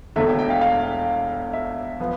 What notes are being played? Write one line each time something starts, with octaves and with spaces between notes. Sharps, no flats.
E1 E2 D3 A3 E5
G5
G5
F5
F5
E5
F3 B3